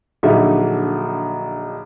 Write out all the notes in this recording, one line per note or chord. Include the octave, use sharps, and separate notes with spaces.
A#1 D3 F#3 D#4 E5